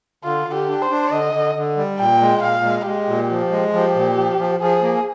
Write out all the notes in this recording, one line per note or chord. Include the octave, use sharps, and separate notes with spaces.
D3 F4
D3
G4
D4
C5
D4
D3 D#5
D3
D3
G3
A#2 G5
G#3
A#2 F5
G#3
G#3 G4
A#2
F3
G#3
F3 G4
A#2
F3
F3
F3 G#4
A#3